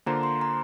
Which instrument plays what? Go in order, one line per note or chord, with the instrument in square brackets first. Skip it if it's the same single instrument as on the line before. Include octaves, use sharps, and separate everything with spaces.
[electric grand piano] D3 A#3 F4 C5 [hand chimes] A#5
[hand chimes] C6
A#5